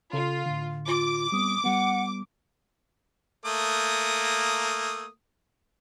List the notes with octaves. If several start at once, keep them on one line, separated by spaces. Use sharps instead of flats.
C#3 F4 A4
A2 D3
F4 D6
G3 B3 C4 D#6
G3 B3 F#5
A3 A#3 D#6